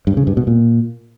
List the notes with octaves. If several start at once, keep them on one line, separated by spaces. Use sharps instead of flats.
G2
C#3
G2
B2
A#2